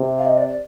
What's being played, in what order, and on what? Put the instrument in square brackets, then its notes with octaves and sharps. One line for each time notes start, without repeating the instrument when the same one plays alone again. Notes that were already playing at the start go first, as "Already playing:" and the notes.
Already playing: [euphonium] C3
[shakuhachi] F5
D#5
D5
D5